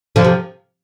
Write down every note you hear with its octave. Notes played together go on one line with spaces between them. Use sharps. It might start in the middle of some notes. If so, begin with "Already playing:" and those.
D3 F3
C3